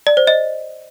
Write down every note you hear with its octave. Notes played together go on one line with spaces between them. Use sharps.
D5
C5
D#5